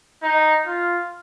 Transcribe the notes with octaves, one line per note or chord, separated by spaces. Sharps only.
D#4
F4